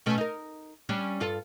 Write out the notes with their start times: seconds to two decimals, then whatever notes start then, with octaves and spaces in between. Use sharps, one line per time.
0.06 B2 A3 C#4
0.18 D#4 A#4
0.89 G3 C#4 D4
1.20 G2 F4 A4